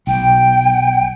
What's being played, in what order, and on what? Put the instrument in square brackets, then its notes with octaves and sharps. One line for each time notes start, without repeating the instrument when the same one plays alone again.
[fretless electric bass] B1 [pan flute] G5